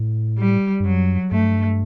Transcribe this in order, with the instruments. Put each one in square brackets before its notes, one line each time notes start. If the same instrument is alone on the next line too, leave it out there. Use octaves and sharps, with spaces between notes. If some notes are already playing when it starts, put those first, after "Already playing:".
Already playing: [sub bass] A2
[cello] G3
[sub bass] G2
[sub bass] F#2 [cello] F#3
[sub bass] G2 [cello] A3